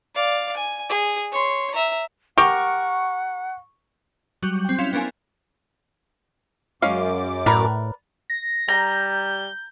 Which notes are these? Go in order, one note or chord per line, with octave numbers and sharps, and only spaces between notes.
D5 F5
G#5
G#4
C#5 C6
E5 A#5
G4 A#4 F#5 C#6
F#3 G3 F#4 G6
C4 G5
C#4 E4 F5 C6 G6 F7
B3 C#4 D4 A#4 F5 G#5
F#2 G#3 C#4 F5 D6
A2 A#4 B4 D5
A#6
G3 A#5 G6